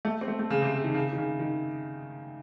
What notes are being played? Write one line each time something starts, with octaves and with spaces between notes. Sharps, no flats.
A3
C4
A3
A3
C#3
C3
C#3
D#3
C#3
D#3
C#3
D#3